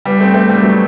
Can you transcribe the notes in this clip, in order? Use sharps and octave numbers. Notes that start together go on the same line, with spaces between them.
G3 B3
A3 C4
A3 C4
G3 B3
F#3 A3